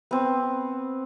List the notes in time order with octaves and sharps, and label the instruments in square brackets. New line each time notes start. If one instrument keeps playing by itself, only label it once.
[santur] B3 C4